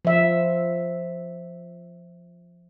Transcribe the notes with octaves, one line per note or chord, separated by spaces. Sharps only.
F3 E5